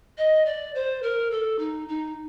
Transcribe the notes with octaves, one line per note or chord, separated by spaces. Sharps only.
D#5
D5
C5
A#4
A4
D#4
D#4